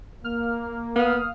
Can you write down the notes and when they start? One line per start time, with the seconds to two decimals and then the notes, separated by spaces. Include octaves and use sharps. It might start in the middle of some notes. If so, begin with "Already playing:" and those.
0.24 A#3 F6
0.96 B3 F5 D#6 F6